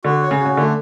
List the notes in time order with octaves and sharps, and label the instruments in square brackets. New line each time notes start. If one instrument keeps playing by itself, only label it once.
[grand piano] D3 [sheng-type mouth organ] F#4
[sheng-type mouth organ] C#5
[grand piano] C#3
[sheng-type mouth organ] F#4
[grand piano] C#3
[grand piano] D3 [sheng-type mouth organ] A3